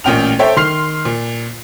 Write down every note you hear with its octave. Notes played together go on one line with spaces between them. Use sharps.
A1 A#2 C#4 G5 F6 F7
A4 C5 C#5 E5 G5
D#3 C6 F6 C7 F7
A#2